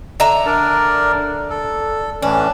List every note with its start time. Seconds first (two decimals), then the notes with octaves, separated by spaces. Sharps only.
0.20 D3 E5 A#5
0.46 D4 A#4 D5
1.50 A4
2.22 A2 E3 C#4 D4